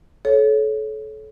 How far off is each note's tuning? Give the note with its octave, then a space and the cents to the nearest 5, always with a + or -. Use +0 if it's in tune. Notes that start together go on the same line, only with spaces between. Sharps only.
A4 -30 C#5 +0